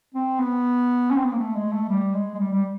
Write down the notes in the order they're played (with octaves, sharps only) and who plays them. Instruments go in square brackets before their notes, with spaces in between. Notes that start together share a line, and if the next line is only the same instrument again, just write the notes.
[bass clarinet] C4
B3
C#4
C4
B3
A#3
A3
G#3
A3
G3
G#3
G#3
G3
G3